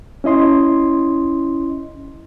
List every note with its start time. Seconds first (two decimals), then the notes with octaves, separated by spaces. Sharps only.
0.24 C#4 E4 D#5 C6